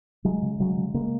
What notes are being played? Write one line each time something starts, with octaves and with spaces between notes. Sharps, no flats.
C#3 F#3 G#3
C#3
C#3 F#3 G#3
C#3
C#3 G#3 A#3